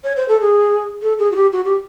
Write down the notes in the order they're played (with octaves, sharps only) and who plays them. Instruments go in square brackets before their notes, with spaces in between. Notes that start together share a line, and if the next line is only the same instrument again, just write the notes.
[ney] C#5
C5
A4
G#4
A4
G#4
F#4
G4
F#4
G4